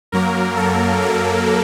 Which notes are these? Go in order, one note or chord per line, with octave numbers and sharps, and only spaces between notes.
F#2 F#3 A#3 A#4
A4
A4